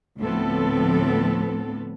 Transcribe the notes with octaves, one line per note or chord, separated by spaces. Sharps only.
D2 A2 F3 B3 C4 A4